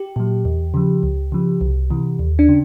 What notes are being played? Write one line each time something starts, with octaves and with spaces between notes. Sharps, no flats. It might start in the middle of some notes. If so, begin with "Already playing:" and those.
Already playing: G4
A#2 F#3
E2
C#3 F3
C#2
C#3 F3
C2
C3 E3
D#2
D4
C#3